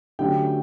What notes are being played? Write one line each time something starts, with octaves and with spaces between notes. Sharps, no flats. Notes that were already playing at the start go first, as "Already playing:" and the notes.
D3 F#3 A3 C#4 G4 G5